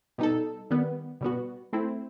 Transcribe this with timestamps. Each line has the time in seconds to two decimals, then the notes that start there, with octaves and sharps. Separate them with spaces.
0.18 B2 G3 D#4 A4
0.70 D#3 G3 B3
1.21 B2 G3 B3 F#4
1.73 A3 C4 E4